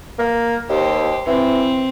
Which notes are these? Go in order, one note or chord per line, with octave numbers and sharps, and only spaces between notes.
A#3
D#2 G4 C5
E3 C4